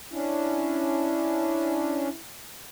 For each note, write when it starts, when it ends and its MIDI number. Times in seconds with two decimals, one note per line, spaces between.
0.12 2.08 61
0.12 2.08 62
0.12 2.19 64